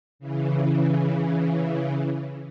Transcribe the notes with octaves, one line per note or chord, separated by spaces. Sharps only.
C#3 E3